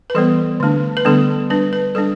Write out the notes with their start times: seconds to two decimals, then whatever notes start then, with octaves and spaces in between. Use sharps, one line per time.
0.10 B4
0.15 E3 G3 B3 A4
0.60 D3 A3 D4
0.97 B4
1.05 D3 G3 B3 D4 A4
1.50 G3 D4 B4
1.73 B4
1.95 G3 D4 A4